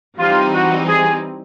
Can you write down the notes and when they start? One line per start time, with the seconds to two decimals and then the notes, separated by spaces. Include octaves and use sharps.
0.18 E3 G3 C4 D#4 F4
0.53 F#4
0.88 G#4